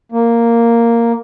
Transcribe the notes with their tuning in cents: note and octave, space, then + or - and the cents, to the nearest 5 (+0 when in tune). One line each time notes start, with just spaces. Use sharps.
A#3 -5